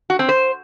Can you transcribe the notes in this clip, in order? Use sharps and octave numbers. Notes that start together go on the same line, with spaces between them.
F#4
C4
C5